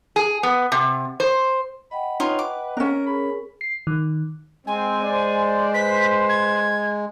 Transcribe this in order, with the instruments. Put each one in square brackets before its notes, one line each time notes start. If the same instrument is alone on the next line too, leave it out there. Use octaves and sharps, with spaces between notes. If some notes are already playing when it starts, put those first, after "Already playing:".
[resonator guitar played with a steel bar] G#4
B3
C3
C5
[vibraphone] D#5 F#5 G5 [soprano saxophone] B5
[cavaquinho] D#4 F4 C#5 [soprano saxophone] B4
[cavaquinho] D6
[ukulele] C#4 D4 [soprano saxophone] A#4
[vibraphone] G#4 A#4 [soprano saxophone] B5
[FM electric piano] C7
D#3
[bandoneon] G#3 [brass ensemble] C4 [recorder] G#5
[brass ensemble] C5 D5
[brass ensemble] B4 C5 [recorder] B6
[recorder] G#6